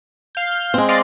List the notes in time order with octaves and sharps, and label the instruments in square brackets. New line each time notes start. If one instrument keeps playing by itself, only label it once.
[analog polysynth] F5 G6
[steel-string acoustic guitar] G#3 C4
[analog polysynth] D5 D#5 F5